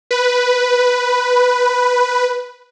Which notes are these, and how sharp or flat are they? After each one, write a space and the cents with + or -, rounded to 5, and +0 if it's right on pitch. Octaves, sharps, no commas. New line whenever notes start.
B4 +0